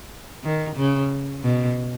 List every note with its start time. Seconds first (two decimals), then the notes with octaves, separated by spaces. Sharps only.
0.44 D#3
0.76 C#3
1.44 B2